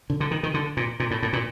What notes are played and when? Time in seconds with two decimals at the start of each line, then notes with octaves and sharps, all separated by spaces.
0.10 D3
0.20 D3
0.31 D#3
0.43 D#3
0.54 D3
0.77 A#2
1.00 A#2
1.11 A2
1.23 A2
1.33 A#2